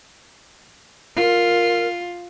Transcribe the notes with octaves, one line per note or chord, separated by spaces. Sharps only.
F4 A#4